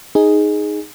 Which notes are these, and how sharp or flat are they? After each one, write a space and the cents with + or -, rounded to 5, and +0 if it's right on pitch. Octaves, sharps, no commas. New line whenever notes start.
D#4 +0 G#4 +0